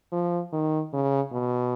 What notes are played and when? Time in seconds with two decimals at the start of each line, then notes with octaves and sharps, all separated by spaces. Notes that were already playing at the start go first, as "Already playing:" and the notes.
0.12 F3
0.53 D#3
0.93 C#3
1.32 B2